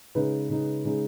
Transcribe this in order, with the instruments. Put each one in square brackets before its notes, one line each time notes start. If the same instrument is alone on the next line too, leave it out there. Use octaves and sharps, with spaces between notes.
[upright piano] C#3 G#3 D#4 B4
C#3 G#3 D#4
C#3 G#3 D#4